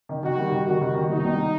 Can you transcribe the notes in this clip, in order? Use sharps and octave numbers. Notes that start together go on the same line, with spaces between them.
D#3
D#3 F#4
G3
D#3
D#3 F#4
D#3
D#3
C2 D#4
C2